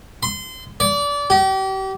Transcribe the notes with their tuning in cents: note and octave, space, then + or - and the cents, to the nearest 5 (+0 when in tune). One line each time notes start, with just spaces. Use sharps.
C6 -30
D5 -30
G4 -35